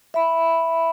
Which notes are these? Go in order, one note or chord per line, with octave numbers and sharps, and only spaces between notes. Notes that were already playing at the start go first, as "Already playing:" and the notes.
E5 B5